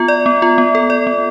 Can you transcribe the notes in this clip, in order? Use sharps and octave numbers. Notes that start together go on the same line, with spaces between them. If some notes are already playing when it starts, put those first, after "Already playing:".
Already playing: B3 F4
D5
B3
F4
B3
A4
D5
B3